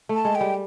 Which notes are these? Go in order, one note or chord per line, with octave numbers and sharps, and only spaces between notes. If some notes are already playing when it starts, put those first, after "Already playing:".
A3 A5
G#3
G5
G3